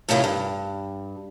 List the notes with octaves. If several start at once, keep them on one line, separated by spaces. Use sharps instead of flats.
A2 C3 D#3 C#4 E4 F4
G2